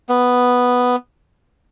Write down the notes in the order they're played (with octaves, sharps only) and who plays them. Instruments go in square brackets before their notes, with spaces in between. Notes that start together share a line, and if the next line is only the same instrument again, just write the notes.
[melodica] B3